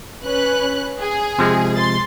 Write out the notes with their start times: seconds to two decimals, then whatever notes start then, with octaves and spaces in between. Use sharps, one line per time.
0.24 C#4 B4 F#6
0.99 G#4
1.39 C3 F3 G#3
1.75 C6 A6